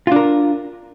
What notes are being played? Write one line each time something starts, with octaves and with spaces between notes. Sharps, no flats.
D4 F4 A#4